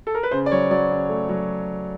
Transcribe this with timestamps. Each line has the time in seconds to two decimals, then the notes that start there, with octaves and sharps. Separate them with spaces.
0.07 A4
0.15 A#4
0.23 B4
0.31 C#3 C5
0.46 D5
0.51 F#3 C#5
0.71 F#3 D5
0.91 C#3
1.09 A3
1.29 F#3